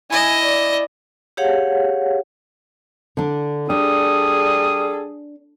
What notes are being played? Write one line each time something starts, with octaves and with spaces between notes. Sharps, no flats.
E4 D#5 G#5
D5
G4 G#4 C#5 F5 F#5
D3 D4
G3 D4 G#4 A4 D#6